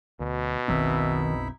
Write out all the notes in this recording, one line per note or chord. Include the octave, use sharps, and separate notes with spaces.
D2 B2
F#1 B1 D#3 C4 D#4 E4 E5